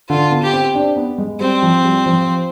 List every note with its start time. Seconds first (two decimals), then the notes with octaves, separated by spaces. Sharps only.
0.09 D3 F4
0.31 B3
0.43 G4
0.53 C4
0.75 D4
0.97 B3
1.18 G#3
1.41 G3 C4
1.63 F3
1.85 G3
2.06 F3